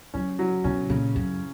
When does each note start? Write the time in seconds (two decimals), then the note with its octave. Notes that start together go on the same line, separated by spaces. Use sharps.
0.14 F#3 C#4
0.39 F#3
0.64 B2 C#4
0.90 A#2 C#3
1.15 F#2 C#3